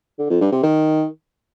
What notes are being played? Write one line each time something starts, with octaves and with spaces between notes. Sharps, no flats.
D3
F2
G2
C3
D#3